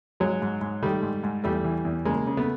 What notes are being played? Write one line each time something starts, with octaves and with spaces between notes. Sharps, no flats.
G#2 F#3 G#3
G#2
G#2
D#3 G3 A3
G#2
G#2
E2 G3 A3
E3
E2
C#3 G#3 A#3
C#3
A3 B3